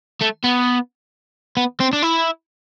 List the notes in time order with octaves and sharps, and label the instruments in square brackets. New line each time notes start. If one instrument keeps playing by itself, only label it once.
[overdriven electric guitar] A3
B3
B3
C4
D4
E4